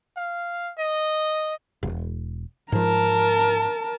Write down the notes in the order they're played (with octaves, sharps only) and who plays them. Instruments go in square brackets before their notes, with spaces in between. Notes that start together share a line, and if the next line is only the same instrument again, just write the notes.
[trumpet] F5
D#5
[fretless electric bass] E1
[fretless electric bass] G#2 F3 [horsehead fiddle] A#4 A5